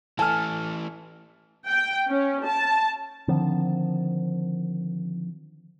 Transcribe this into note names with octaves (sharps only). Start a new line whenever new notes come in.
E3 A3 A4 G#5 F6
G5
C#4
A5
D3 D#3 F3 C4